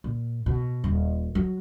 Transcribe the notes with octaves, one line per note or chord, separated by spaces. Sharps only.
A#2
B2
D#1
F#3